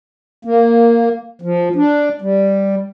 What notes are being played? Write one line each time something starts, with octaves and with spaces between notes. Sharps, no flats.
A#3
F3
D4
G3